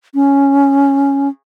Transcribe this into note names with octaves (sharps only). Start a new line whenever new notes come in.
C#4